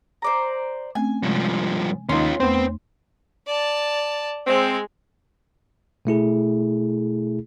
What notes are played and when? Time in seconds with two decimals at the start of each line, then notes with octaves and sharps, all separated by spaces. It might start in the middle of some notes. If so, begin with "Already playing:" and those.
0.22 C5 D5 A#5
0.95 A3 C4 C#4 G#5
1.23 G2 C3 F3 G#3
2.09 D#2 C#4 D#4 F4 C6
2.40 E2 A3 B3 C4 C5
3.47 D5 A5
4.47 G#3 C4
6.05 B2 A3 E4 G#4